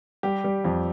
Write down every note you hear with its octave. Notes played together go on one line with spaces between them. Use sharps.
G3 G4
G3
F2